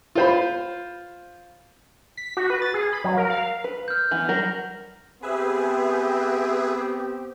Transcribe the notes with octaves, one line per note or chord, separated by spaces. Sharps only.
F4 C5 B5
B6
F#4
B4
A6
G#4
B5
F#3
A#4
F5
B4
F6 G6
E3 B3
F#3 G3 A#4 A#6
B3 C4 G4 G#4 B4 E5